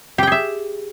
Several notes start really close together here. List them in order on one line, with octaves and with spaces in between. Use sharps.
G4 G5 G#4 E5